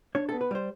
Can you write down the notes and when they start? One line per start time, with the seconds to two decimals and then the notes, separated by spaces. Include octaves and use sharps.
0.15 D4 C#5
0.29 B3 A4
0.41 B4
0.51 G3 C5